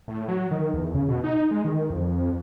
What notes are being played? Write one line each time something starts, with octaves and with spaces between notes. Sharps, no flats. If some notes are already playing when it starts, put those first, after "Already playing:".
A2
F#3
D#3
E2
C#3
B2
D#4
G#3
D#3
F2